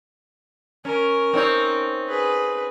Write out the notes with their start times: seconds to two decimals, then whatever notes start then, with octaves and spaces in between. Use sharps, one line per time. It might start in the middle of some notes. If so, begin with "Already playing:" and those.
0.85 C#4 A#4
1.33 C4 D#4 C#5
2.08 G#4 B4